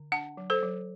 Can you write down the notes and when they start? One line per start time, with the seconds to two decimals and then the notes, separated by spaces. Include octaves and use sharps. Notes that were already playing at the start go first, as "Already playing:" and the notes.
Already playing: D3
0.12 D4 F#5 A5
0.37 F#3
0.50 A4 C5
0.63 F#3